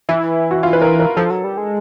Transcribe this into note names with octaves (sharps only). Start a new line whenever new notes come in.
E3 E4
F#4
F4
B4
A#4
A#4
F3 A4
F#3
G3
G#3